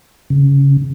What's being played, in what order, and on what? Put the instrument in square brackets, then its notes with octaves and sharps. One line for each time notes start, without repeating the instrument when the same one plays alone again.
[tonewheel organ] C#3